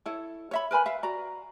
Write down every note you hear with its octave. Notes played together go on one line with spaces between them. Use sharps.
E4 A4 C#5
C#5 E5 B5
A#4 B4 G#5 B5
E5 F5
F#4 D5 A#5